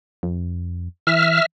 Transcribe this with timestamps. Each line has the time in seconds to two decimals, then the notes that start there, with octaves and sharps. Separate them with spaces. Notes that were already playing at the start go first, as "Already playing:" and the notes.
0.23 F2
1.07 E3 E5 F6